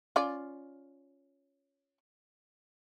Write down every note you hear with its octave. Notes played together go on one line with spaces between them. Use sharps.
C#4 F4 D5